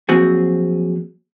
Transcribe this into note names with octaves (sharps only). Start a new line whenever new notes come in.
F3 F#3 A#3 C4 F#4 G#4